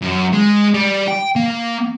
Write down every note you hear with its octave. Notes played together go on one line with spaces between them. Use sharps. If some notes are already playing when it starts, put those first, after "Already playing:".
F#2
G#3
G3
G5
A#3